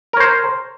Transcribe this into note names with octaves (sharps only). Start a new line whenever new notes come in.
A#4 C5 C#5